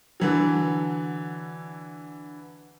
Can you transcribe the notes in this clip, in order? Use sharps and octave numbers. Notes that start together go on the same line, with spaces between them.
D3 E3 F#3